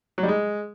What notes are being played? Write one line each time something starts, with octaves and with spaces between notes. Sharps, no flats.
F#3
G3
G#3